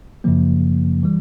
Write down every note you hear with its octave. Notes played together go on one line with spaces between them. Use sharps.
F#2 C#3 F3 A#3
E3 G3